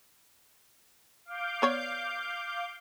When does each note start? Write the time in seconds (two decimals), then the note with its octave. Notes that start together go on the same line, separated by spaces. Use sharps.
1.25 F5 D6 G6
1.62 B3 C#5 D5